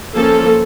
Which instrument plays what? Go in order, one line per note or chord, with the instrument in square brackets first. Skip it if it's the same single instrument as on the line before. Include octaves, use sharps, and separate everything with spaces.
[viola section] F3 A#3 C#4 A4